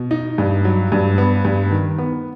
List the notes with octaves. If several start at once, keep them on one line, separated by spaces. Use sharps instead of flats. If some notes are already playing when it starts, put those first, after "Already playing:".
Already playing: B2
D#4
G2
F#3
G2
B3
G2
D#3
B3